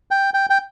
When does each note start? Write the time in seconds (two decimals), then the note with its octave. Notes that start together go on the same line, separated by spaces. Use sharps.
0.11 G5
0.34 G5
0.50 G5